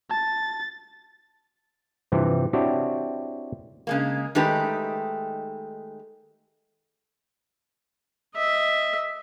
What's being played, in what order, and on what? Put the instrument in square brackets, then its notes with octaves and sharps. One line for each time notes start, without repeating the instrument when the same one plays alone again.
[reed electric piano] A5 [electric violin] A6
[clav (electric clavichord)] G2 C3 E3 F3 C4
C4 D4 E4 F#4 G4 C#5
[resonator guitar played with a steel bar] C#3 G#3 A#3
D#3 G#3 A3 D#4 G4 B4
[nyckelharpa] D#5 E5